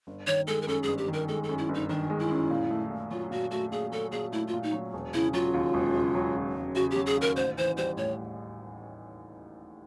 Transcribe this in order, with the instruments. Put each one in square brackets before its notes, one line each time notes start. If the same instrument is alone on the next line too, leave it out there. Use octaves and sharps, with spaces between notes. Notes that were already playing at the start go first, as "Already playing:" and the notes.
[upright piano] G1
[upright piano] D#3 [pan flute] C#5
[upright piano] G#3 [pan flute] A4
[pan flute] A#4
[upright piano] F#2 [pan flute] A4
[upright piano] G1 [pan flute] G#4
[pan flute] G4
[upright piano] D#3 [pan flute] A#4
[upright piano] G#3 [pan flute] A4
[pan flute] A4
[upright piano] F#2
[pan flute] E4
[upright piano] G1
[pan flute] D#4
[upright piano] D#3 [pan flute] D4
[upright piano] G#3
[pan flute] E4
[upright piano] F#2
A#2
A3
A#2
[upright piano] F#3 [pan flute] F4
[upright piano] A#2 [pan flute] F#4
[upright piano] A3 [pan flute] F#4
[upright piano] A#2 [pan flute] G#4
[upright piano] F#3 [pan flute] A4
[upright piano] A#2 [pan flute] G#4
[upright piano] A3 [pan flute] E4
[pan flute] F4
[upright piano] A#2
[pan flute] D#4
[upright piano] F#3
E1
[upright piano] C#3 [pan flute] E4
[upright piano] F#3 [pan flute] F4
[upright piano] D#2
E1
C#3
F#3
D#2
E1
[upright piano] C#3 [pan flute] F#4
[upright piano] F#3 [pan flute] G4
[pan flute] G#4
[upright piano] D#2 [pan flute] A#4
[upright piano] A1 [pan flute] C5
[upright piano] E3 [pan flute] C5
[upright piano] G3 [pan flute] C5
[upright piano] A2 [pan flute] C#5